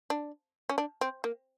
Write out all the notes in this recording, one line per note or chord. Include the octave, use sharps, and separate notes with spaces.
D4
C#4
D4
C4
A#3